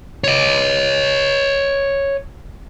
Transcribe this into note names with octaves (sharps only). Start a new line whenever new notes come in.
C#5 D#5